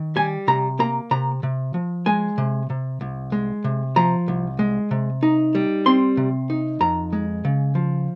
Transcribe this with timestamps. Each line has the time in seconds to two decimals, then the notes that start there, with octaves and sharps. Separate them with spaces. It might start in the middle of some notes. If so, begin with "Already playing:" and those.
Already playing: D#3
0.16 G3 G#5
0.48 C3 A#5
0.79 A#3 A#5
1.11 C3 A#5
1.43 C3
1.74 F3
2.06 G#3 G#5
2.38 C3
2.70 C3
3.01 C2
3.32 G#3
3.64 C3
3.96 F3 A#5
4.28 C2
4.59 G#3
4.91 C3
5.23 D#4
5.55 G3
5.86 C4 C6
6.17 C3
6.50 D#4
6.80 F2 A#5
7.13 G#3
7.45 C#3
7.75 F3